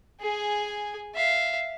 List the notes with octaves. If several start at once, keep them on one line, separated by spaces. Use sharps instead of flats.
G#4 G#5
E5 F5